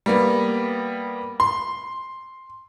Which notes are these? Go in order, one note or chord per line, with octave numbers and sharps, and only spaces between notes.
G3 A#3 B3
C6